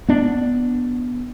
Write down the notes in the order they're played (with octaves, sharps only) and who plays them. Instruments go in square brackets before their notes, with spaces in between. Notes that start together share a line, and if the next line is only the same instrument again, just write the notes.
[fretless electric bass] B3 D4